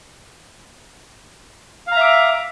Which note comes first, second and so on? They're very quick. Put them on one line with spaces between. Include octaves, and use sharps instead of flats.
F5 A#5 E5 D6